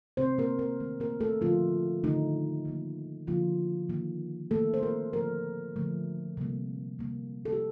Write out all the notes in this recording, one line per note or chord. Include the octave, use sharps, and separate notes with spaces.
C3 D#3 A3 C4 C5
A#3 A#4
A#3 A#4
C3 D#3 A3
A#3 A#4
A3 A4
D3 F3 A3 F4
D3 D#3 A3 D#4
D3 F3 A#3
D3 F3 A#3 F4
D#3 A#3
D#3 A3 A#3 A4
C5
A#3 A#4
D3 F3 A3 A#3 A#4
D3 F3 A3
C3 G3 A#3
C3 G3 A#3
A4
G4